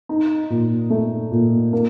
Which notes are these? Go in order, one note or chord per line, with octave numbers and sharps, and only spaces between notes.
D#4
A#2
A3
A#2
A#3